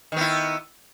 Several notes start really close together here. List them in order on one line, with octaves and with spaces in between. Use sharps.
D#3 B3 E4